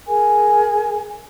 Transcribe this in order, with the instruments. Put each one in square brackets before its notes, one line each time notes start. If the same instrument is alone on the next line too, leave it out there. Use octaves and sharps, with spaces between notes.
[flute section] G#4 A#4 G#5